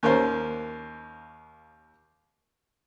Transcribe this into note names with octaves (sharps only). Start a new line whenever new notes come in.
D#2 A#3 C#4 C5